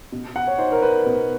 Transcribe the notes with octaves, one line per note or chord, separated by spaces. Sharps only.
B2
F#5
C#5
D#4 C5
A#4
B4
B2